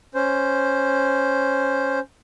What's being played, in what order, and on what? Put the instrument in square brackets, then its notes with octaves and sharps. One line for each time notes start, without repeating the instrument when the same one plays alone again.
[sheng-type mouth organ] C#4 C5